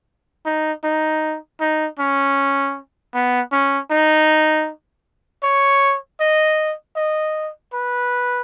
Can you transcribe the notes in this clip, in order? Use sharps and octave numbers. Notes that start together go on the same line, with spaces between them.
D#4
D#4
D#4
C#4
B3
C#4
D#4
C#5
D#5
D#5
B4